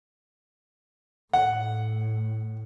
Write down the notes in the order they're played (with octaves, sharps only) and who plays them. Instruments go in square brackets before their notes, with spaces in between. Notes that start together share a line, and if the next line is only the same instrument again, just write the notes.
[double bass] A2 [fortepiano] F#5